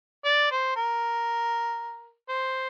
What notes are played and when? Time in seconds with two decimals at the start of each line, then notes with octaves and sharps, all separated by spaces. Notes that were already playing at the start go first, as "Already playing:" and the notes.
0.25 D5
0.51 C5
0.76 A#4
2.29 C5